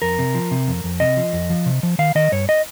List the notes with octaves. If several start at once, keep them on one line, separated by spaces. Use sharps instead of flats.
F2 A#4
C3
F3
C3
F2
F2
C3 D#5
F3
F2
F3
C3
F3
D#3 F5
D#3 D#5
G2 C#5
D#5